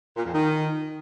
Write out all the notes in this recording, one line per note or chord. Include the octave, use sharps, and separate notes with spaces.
A#2
F2
D#3